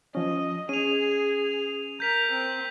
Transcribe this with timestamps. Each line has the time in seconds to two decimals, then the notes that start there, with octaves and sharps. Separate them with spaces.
0.15 F3 C#4 D#5
0.69 C#4 G#4 D#7 F7
2.00 A#4 G6 B6 F7
2.32 C4